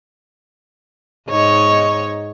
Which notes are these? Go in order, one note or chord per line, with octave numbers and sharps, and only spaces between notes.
G#2 D#4 C#5